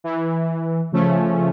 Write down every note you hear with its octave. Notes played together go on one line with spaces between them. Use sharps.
E3
C#3 F3 A3 C#4